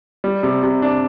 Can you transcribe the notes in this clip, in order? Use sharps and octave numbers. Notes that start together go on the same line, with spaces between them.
G3
C3
C3
D4